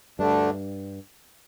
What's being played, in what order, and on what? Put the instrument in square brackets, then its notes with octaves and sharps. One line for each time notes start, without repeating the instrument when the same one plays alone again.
[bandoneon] D2 D3 A3 D4 [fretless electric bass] G2